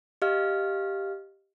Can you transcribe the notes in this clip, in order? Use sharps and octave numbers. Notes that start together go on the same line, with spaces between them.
G4 D#5 F5 F6